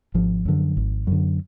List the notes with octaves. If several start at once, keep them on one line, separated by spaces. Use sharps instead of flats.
G#1 F3
F#2 D3
G#1
F#2 D3